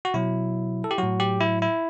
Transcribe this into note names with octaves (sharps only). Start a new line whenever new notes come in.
F#4
B2 F#3 E4
A4
G4
A2 F#3 F#4
G4
E4
E4